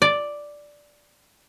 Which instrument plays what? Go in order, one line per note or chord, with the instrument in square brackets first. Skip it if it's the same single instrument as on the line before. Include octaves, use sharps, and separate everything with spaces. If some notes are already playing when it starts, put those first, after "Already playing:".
[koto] D5